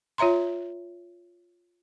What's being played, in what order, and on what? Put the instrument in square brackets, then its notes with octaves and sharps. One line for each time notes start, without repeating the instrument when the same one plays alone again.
[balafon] F4 C#5 E5 A#5 C6